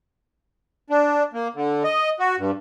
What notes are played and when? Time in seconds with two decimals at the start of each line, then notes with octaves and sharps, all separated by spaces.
0.90 D4
1.33 A#3
1.55 D3
1.84 D#5
2.19 F#4
2.38 G2